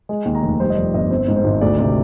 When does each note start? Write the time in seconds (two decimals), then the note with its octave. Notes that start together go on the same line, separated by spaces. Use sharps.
0.09 G#3
0.25 D#2
0.34 A#5
0.42 F1
0.60 G3 C5
0.70 D#5
0.77 F2 D5
0.94 G1 D#5
1.11 C4 C5
1.28 G#2
1.36 C5
1.44 G#1
1.61 D2 D5
1.79 C3 D5